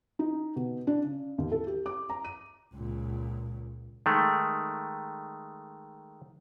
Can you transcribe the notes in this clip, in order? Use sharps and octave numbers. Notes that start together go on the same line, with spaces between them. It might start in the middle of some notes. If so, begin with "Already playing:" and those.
D#4
B2
D4
C#3
D#2
A4
G4
D6
A#5
D#7
C#2 A#2
D#3 G#3 A3